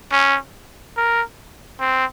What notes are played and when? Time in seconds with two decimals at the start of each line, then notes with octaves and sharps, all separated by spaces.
0.12 C#4
0.97 A#4
1.80 C4